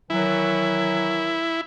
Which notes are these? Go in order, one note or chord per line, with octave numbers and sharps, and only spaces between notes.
D#3 E3 F#3 E4